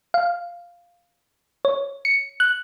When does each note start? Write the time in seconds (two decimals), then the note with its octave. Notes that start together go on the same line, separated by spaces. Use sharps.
0.14 F5
1.65 C#5
2.05 C#7
2.40 F#6